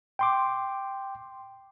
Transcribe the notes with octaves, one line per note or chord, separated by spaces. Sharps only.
G5 C6 D6